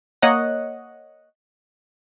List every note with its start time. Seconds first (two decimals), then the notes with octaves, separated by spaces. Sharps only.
0.22 A#3 C#5 D#5 F#5